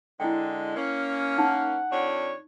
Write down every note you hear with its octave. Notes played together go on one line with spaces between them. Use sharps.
D3 G#3 E4 G5
A#3 C#4
D#4 F#5
F2 D4 C#5